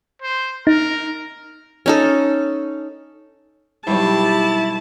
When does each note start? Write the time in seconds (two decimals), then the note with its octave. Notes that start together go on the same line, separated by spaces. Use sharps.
0.22 C5
0.67 D#4 A#4
1.86 C#4 D#4 A4
3.87 B1 G2 E4 G4 A5